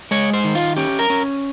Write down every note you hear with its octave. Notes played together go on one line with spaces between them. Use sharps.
G#3 C#5
C5
D#3
F4
C#4 G4
A#4
C#4